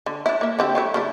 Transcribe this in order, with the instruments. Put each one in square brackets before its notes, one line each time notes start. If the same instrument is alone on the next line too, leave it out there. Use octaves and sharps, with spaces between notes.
[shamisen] D3
D4 E4
A#3 E5
D3 C4 G4
F#3 A3 E4
C#3 D4 E4